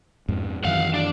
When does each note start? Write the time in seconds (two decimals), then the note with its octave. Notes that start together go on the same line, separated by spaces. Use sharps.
0.28 F2 G#2
0.64 F#2 D#3 E3 F5 F#5
0.93 D4 D5